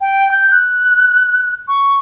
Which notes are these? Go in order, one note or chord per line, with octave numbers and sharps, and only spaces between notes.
G5
G6
F#6
C#6